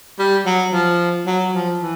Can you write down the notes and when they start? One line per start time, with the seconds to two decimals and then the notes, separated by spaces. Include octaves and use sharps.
0.19 G3
0.46 F#3
0.73 F3
1.26 F#3
1.53 F3
1.80 E3